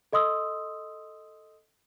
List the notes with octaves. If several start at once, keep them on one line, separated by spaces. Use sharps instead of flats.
A4 D#5 C6 D#6 E6